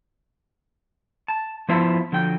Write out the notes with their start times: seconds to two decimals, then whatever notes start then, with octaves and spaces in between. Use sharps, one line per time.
1.28 A5
1.69 F3 B3 E4 C5 E5 A5
2.12 D3 F3 F#3 G5